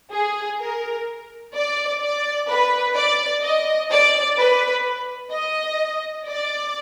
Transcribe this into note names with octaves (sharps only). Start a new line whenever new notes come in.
G#4
A#4
D5
D5
B4
D5
D#5
D5
B4
D#5
D5